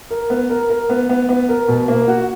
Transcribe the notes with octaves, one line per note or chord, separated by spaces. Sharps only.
A#4
B3
A#4
A#4
B3
B3
B3
A#4
B2
A#3
F#4